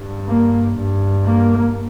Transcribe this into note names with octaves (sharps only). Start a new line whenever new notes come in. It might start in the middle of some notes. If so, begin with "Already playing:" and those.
Already playing: G2
A#3
G2
A#3